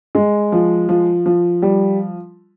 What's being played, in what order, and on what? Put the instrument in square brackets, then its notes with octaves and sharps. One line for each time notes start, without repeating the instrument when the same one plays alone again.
[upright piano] G#3
F3
F3
F3
G3